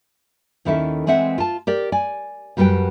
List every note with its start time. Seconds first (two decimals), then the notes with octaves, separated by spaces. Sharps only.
0.65 D#2 D#3 C#4 E4 A4 E5
1.06 E3 G#3 C4 E5 F#5
1.38 F4 A5
1.67 G4 A#4 D5
1.92 D5 G#5
2.57 F#2 G3 F#4 G4 B4 G5